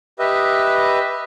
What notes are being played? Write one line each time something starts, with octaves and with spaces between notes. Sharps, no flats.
G4 B4 D#5 E5